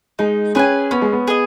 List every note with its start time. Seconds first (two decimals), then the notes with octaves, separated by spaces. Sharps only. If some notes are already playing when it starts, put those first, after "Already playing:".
0.19 G#3 D#4
0.55 C#4 G#4 B4 G#5
0.91 B3 C#4
1.02 G#3
1.12 B3
1.28 G#4 D#5